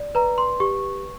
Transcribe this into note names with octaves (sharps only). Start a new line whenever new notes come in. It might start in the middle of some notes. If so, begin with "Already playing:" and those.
Already playing: D5
B4 A#5
C6
G4 C#6